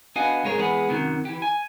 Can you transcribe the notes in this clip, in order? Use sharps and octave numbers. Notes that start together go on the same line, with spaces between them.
B3 D4 F#4 D#5 F5 G#5
C2 G#2 G#3 G#4 A#4 C#5
E3 G#3 B3 G#4
F#2 C3 D#3 F#3
E3 G4
G#5